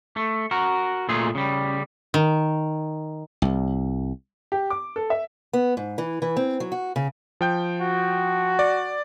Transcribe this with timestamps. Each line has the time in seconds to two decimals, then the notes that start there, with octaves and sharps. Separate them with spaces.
0.17 A3
0.51 F#4 A#4
1.09 A#2 A3 F4 G#4
1.35 C#3 G3
2.14 D#3
3.42 C2
4.52 G4
4.70 D6
4.96 A4
5.10 E5
5.53 B3
5.77 G#2
5.98 E3
6.22 E3
6.37 C4
6.60 F#3
6.72 F#4
6.96 C#3
7.41 F3 G5 G6
7.81 F#4
8.59 D5